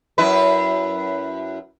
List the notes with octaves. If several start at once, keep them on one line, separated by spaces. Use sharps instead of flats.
F#2 E4 B4